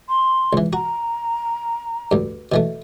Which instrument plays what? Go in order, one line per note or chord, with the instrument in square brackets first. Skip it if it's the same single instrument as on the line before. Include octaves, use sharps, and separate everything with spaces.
[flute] C6
[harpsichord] C#2 E3
[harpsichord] F#4 [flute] A#5
[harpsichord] D2 G2
B2 E3 A3